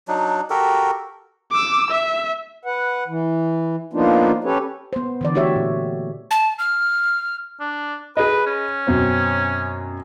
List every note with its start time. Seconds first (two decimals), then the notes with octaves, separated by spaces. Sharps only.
0.08 F#3 D4 D#4
0.50 F#4 G4 A4 A#4
1.52 D6 E6
1.91 E5
2.65 B4 F#5
3.08 E3
3.93 F3 A#3 B3 D4 D#4 F4
4.44 C#4 G4 A4 B4 C#5
4.93 B3 C5
5.21 D3 E3 D5
5.35 A3 F#4 G4 C#5 E5
5.56 A#2
6.31 A5
6.59 F6
7.60 D4
8.17 G#4 B4 D#5
8.46 C#4
8.87 F#2 B2 C4